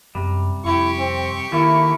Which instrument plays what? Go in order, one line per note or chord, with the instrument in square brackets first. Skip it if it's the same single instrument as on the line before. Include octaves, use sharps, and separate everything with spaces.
[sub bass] F#2 [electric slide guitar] C3 G3
[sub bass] F2 [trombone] E4 [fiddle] G4 C#6
[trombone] C4
[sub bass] D#3 [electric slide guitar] A3 A#3 [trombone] E4